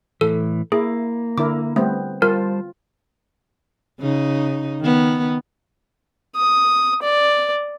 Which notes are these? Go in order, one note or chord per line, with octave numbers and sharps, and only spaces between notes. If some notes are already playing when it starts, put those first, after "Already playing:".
A2 E3 A4
A#3 E4 G#4
D3 E4 A#4 D6
G3 A3 B3 C4
G3 F4 A#4 C5 A5
C#3 D#4
D#3 B3
D#6
D5